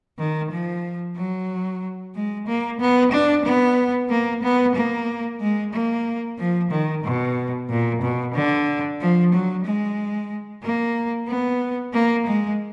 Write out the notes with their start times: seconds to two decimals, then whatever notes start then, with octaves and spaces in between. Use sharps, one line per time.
0.18 D#3
0.51 F3
1.16 F#3
2.15 G#3
2.47 A#3
2.80 B3
3.12 D4
3.45 B3
4.10 A#3
4.43 B3
4.75 A#3
5.41 G#3
5.73 A#3
6.38 F3
6.71 D#3
7.04 B2
7.69 A#2
8.02 B2
8.35 D3
9.00 F3
9.33 F#3
9.65 G#3
10.63 A#3
11.28 B3
11.93 A#3
12.26 G#3